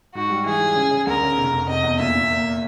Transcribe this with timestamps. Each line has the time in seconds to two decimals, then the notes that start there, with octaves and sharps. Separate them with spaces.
0.14 G#2 F#4
0.30 G3
0.46 E3 G#4
0.61 G3
0.76 C#3
0.91 C#3
1.07 D2 A#4
1.23 C#3
1.38 F1
1.53 F1
1.69 C3 D#5
1.84 E2
1.99 A#2 E5
2.15 A#2
2.31 A#3